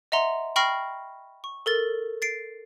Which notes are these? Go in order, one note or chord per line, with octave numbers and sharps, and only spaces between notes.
D#5 E5 F#5 A#5 C6
G5 B5 C#6 F6 A#6 C7
C#6
A4 A#4 A6
A6 C7 D7